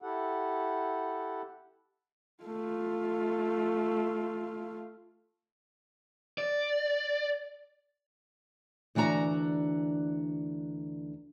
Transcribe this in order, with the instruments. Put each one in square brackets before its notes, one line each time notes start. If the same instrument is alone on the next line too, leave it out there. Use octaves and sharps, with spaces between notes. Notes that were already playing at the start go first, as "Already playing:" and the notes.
[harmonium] E4 G4 A4 F#5
[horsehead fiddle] A3 F4
[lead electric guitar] D5
[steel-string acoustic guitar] D2 E3 D4 F#4 A#5